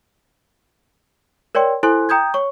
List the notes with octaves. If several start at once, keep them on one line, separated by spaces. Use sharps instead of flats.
A#4 C#5 D5 G5 C6
E4 A4 C5 G#5 C6 F#6
G5 A#5 D#6 G6 G#6
C#5 C#6